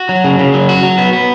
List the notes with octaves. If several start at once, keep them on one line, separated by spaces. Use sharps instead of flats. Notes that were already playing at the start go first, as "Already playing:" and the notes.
Already playing: F#4
F#3
C#3
C#3
F#3
F#4
F#3
B3
B3